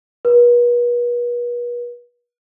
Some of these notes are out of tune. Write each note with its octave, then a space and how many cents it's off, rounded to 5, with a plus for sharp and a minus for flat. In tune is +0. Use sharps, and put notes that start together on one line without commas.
B4 -40